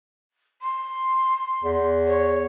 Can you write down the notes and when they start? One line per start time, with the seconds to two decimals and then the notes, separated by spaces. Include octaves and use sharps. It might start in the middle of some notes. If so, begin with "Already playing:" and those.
0.61 C6
1.64 E2
2.07 C#5